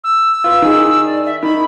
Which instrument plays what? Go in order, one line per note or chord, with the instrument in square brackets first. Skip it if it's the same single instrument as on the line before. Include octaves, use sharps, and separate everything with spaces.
[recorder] E6
[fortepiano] F4 B4
D#3 G#4
[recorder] D5
E5
[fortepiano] D#3 [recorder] B5